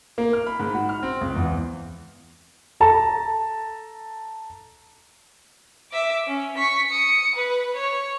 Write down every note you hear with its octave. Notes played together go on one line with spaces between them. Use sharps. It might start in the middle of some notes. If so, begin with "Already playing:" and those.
A#3
F6
B5
G#2
F#4
F6
C4
C#2
E2
A4 A5 A#5
E5 D6
C#4
C#6 B6
D#6 C#7
B4
C#5